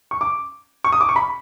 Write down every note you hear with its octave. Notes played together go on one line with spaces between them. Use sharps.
C#6
D6
C#6
D#6
D6
C#6
B5